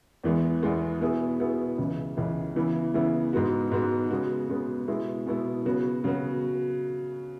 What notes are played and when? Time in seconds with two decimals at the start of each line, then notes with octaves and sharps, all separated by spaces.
0.24 E2 E3 G#3 B3
0.62 E2 E3 G#3 B3
1.00 B2 B3 E4 G#4
1.40 B2 B3 E4 G#4
1.78 C#2 C#3 E3
2.17 C#2 C#3 E3
2.56 C#3 E3 B3 E4
2.94 C#3 E3 B3 E4
3.33 G#2 G#3 B3 F#4
3.71 G#2 G#3 B3 F#4
4.11 C#3 G#3 B3 F#4
4.49 C#3 G#3 B3 F#4
4.88 B2 G#3 B3 E4
5.27 B2 G#3 B3 E4
5.65 C#3 F#3 B3 F#4
6.04 C#3 F#3 B3 F#4